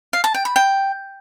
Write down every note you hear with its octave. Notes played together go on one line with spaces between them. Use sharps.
F5
A5
G5
B5
G5